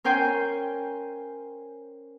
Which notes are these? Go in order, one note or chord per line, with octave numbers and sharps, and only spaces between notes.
C#4 A#4 C5 G5 G#5 C6